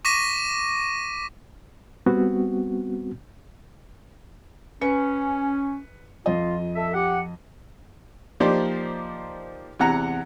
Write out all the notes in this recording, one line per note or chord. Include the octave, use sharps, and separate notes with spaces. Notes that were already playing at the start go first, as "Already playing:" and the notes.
C#6 D6 A#6 B6 D#7
G3 B3 C4 F#4
C#4 B4 C#7
F2 F4 D#5
A4 E5
G4 F#5
F3 A#3 D#4 G4 C5 D5
E2 C3 F#5 A#5